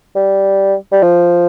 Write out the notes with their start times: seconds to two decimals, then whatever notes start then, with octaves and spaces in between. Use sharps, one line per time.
0.16 G3
0.92 G3
1.03 F3